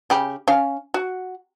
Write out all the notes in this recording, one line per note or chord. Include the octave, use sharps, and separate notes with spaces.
C#3 G4 B5
C#4 F5
F#4